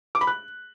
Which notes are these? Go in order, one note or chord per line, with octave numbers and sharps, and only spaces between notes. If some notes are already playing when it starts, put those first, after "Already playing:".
D6
B5
F#6